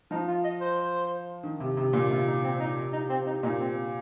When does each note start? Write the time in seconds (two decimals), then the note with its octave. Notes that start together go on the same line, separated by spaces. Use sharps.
0.11 F3 D#4
0.28 F4
0.44 D#5
0.61 C5
1.43 D#3
1.60 C3
1.77 C3
1.93 A#2
2.10 C3 F4
2.27 D#4
2.43 C4
2.60 D#4
2.92 D#4
3.09 C4
3.26 D#4
3.43 A#2 D#4
3.60 C4